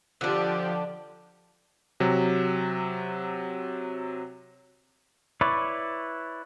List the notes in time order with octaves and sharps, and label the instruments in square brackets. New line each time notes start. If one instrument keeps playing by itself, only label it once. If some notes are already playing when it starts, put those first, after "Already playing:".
[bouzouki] D3 D4 [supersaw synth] F3 G4
[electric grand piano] C3 F#3
[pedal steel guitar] E4 B4 C#5 D5